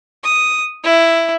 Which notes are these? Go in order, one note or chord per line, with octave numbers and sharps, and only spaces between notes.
D#6
E4